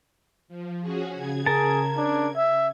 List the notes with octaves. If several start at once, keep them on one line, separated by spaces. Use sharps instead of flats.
F3
C#4 F#4 G#4
C#3 G#6
G#4 A#4 A5
D4
E5